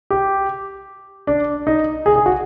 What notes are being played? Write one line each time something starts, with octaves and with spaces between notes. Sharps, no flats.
G4
D4
D#4
G#4
G#4
F#4